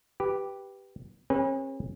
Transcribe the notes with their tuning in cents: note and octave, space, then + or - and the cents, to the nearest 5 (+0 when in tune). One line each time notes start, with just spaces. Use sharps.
G4 +0 B4 +0
C#4 -45 G#4 -10 B4 -20